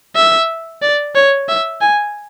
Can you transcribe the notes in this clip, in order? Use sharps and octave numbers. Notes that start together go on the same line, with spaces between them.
E5
D5
C#5
E5
G#5